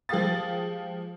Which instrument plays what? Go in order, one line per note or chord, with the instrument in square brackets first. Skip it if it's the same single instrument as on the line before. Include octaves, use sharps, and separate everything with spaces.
[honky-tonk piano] F3 G#3 G4 F5 D#6 A6